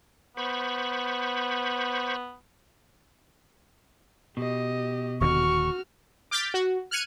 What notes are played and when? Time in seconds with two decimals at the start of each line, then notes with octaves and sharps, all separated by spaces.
0.37 B3 C5 B5 C#6
4.37 B2 G4 D#5
5.21 D#1 D#2 D3 F#4 C#6 F6
6.31 D6 F6 G6 A6 B6
6.54 F#4
6.91 F6 F#6 G#6 C#7 D#7